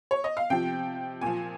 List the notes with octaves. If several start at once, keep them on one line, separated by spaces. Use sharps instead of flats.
C#5
D#5
F5
C3 F3 G5
A#2 F3 G#5